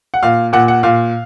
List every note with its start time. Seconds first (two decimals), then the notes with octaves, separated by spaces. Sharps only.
0.14 F#5
0.23 A#2 F5
0.53 A#2 F#5
0.68 F#5
0.83 A#2 F5